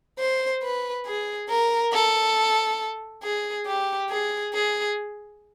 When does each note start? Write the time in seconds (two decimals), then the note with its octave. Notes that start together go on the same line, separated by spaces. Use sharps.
0.19 C5
0.63 B4
1.06 G#4
1.50 A#4
1.93 A4
3.23 G#4
3.66 G4
4.10 G#4
4.54 G#4